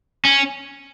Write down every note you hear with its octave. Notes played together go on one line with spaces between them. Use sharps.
C#4